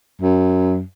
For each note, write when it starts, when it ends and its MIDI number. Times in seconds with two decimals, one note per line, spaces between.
0.22 0.83 42